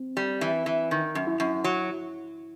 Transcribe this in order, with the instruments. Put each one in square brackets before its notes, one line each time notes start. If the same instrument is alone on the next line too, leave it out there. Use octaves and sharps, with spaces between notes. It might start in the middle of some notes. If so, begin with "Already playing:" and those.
Already playing: [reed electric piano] C4
[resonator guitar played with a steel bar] G3
E3
E3
D#3
F#2
[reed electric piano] E4
[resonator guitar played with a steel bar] F#2
F#3